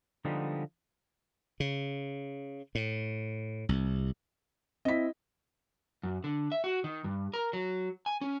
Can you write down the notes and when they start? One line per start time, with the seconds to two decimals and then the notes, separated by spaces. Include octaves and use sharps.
0.25 D3 F3 G3 G#3 B3 D#4
1.60 C#3
2.75 A2
3.69 C2
4.85 C4 E4 D#5 B6
6.03 F#2
6.24 D3
6.52 E5
6.64 F#4
6.84 D#3
7.04 G2
7.34 A#4
7.53 F#3
8.06 G#5
8.21 C#4